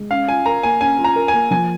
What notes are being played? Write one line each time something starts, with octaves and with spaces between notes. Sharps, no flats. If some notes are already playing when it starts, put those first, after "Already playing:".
Already playing: G#3
C#4 F5
F4 G#5
A#4 A#5
A#3 G#5
C#4 G#5
F4
A#5
A#4
A#3 G#5
F3 G#5